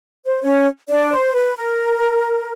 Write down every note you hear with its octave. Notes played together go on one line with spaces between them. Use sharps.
C5
C#4 C#5
D4 D5
C5
B4
A#4